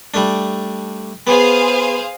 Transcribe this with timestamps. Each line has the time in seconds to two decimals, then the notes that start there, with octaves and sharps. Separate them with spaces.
0.14 G3 A3 D4
1.27 B3 G#4 C5 F5